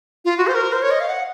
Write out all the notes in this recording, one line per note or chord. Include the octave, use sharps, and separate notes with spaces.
F4
F#4
C5
A#4
C5
C#5
D#5
F5
F#5